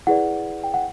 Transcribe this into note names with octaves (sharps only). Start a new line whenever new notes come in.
E4 G#4 B4 D5 F#5
G5
F#5